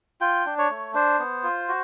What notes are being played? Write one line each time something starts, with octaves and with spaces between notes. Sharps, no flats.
F4 G5
D4
C#5
A3
D4 C5
B3
F4
F#4